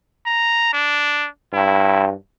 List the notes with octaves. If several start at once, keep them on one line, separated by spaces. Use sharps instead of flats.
A#5
D4
G2 E4